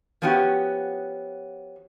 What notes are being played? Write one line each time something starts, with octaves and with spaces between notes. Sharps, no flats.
F3 B3 C#4 F#4 G4